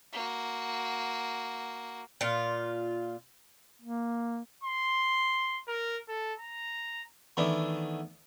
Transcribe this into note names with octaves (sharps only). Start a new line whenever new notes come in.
A#3 F#4
A#2 F4
A#3
C6
A#4
A4
A#5
D#3 E3 A3 B3 D4